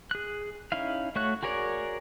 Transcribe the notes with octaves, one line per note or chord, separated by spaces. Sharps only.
G#4 F#6
C#4 D#4 E4 F5
A3 F#4 C#5 F#6
F#4 G#4 A#4 C#5 D5